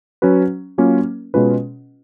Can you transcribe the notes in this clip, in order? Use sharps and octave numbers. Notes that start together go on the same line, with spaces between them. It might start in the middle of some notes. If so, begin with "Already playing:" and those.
F#3 C#4 F#4 B4
F#3 A#3 C#4 F4 A#4
B2 G#3 C#4 F4 B4